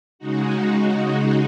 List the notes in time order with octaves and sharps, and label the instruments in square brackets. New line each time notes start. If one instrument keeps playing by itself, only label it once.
[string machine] C#3 G#3 D#4 F#4